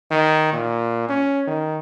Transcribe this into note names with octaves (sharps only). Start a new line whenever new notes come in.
D#3
A#2
C#4
D#3